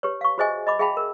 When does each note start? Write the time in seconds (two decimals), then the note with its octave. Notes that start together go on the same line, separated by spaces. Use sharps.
0.03 G4 B4 C#5
0.21 F5 C#6
0.38 F#4 G#4 C5 D#5 E5 G#5
0.67 D#5 B5 D6
0.79 G#4 E5 F5 G5 A5 B5
0.97 A#4